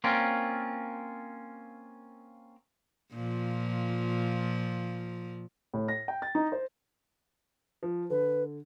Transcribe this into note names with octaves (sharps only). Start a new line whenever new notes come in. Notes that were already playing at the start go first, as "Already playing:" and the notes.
A#3 C4 C#4 F4 A#4 D5
A#2 F3
A2
A#6
G5
A6
D#4
C5
F3
D3 B4